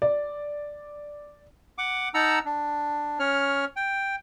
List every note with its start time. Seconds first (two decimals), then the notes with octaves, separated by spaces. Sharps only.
0.02 D5
1.78 F#5 D6
2.14 D#4 F#5 A5 A#5 E6
2.45 D4
3.19 C#4 C#5 F6
3.76 G5